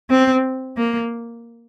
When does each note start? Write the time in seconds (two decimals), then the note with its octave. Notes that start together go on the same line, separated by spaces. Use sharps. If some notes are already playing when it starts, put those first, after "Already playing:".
0.10 C4
0.77 A#3